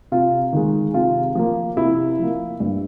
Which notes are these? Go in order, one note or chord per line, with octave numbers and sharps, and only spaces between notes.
C3 F4
D#3 G#3
C3 F4
F3 A#3
C3 E4
F3 A#3
G2